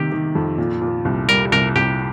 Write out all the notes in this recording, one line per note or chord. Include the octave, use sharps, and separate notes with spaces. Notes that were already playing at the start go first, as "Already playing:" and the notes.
Already playing: C3 D#3 A#3 G4
D#3
F2
A#2
A#2
C2
G3 A#4
C2 A#4
C2 G4